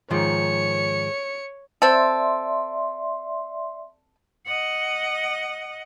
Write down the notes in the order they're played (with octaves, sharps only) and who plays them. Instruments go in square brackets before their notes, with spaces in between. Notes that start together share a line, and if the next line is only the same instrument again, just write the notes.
[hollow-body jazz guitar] G#2 D#3 F3 [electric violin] C#5 C#7
[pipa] C4 A4 [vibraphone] D5 E5 C6
[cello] D#5 F#5